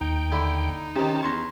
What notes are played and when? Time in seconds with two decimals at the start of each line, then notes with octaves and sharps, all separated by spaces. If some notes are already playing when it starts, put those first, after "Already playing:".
0.01 D#2 D#4 G5
0.32 D3 E4
0.96 C3 D#3 C#4 A5
1.23 E2 A#5 C6 C#6